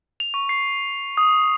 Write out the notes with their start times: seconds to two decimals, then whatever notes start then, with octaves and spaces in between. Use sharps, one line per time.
0.20 F7
0.34 C#6
0.49 C7
1.17 D#6